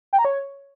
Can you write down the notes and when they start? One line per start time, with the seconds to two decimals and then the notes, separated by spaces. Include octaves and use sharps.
0.13 G5
0.19 A#5
0.25 C#5